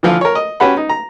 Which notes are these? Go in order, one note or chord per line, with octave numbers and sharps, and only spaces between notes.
D3 E3 F3 F4
A#4 C#5
D#5
C#4 F#4 G4 B4 F#5 B5
D#4
A#5